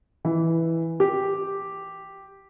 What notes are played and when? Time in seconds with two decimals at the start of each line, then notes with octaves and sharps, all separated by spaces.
0.25 E3
1.00 G4